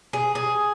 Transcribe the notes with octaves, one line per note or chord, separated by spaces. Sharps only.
G#4
G#4